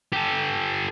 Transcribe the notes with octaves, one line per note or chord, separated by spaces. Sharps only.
G4 A4